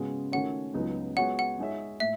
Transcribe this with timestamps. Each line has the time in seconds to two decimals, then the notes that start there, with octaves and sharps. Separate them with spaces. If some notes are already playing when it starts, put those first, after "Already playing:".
Already playing: C#3 G#3 B3 F#4
0.32 D#3 A3 C#4 F#4 C#5 F#5
0.74 C#2 C#3 F#3 B3 D#4
1.17 G#3 B3 F#4 C#5 F#5
1.39 F#5
1.58 G#3 D#4 G#4 C#5 E5
2.00 A2 E5